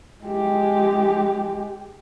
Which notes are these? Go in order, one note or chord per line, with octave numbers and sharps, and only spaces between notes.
G#3 G4